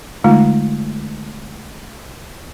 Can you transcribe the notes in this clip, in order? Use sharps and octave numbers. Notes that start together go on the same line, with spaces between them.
D3 G#3 A3 D#4 F4